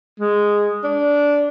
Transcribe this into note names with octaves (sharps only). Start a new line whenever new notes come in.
G#3
D4